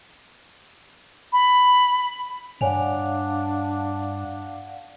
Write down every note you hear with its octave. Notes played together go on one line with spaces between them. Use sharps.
B5
G2 D4 C#5 D5 F5 F#5 G#5 F7